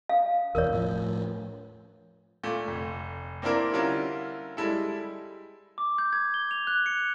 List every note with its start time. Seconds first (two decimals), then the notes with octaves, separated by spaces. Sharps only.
0.09 F5
0.55 E1 E2 A#4 C#5
0.72 A2 F3
2.43 A#2 A3
2.67 F1
3.42 A#3 C4 D4 E4 A#4
3.73 D3 G3 C#4 E4 F4 A#4
4.57 G3 G#3 E4 A4
5.78 D6
5.98 G6
6.13 G#6
6.34 G7
6.51 F7
6.67 F#6
6.86 C#7